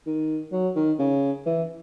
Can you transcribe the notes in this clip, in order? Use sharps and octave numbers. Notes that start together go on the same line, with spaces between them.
D#3
F#3
D#3
C#3
E3